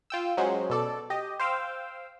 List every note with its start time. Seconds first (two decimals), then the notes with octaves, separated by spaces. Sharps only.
0.10 F4 G5 E6
0.37 F#3 G#3 C#4 F#4 C5
0.70 B2 A4 D5
1.10 G4 D#5
1.40 C5 F5 G5 E6